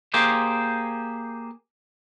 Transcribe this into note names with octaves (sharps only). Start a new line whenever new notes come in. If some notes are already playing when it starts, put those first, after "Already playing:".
A#3 G4 G#4 C5